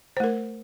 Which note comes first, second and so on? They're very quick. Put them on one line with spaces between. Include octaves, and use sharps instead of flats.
C5 A3 A#4